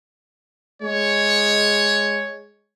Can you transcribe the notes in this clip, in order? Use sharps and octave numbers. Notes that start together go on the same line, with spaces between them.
G#3 C#5